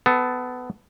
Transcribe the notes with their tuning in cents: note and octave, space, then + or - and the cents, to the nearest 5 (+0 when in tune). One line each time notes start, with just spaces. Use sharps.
B3 +20 A4 -5